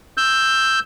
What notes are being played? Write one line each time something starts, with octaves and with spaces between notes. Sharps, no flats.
E6 G6